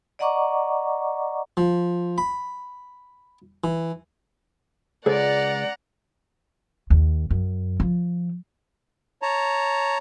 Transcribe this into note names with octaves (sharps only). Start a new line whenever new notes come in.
D5 D#5 F#5 A#5 C#6 D6
F3
B5
E3
C#2 G#3 G#4 A4 C5 D5 F#5 A#5
D#2
F#2
F3
C#5 A5 A#5